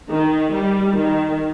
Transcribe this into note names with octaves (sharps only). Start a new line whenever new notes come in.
D#3
G3
D#3